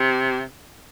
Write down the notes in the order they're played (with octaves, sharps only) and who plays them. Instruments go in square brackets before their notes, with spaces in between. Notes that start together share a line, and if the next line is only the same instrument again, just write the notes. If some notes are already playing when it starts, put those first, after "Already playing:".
Already playing: [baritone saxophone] C3